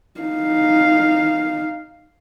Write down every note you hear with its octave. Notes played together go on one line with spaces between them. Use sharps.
D#4 F5